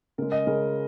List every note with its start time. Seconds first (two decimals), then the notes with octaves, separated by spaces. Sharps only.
0.18 C#3 G#3 A#4
0.32 D#5
0.47 C#3 G#3 A#4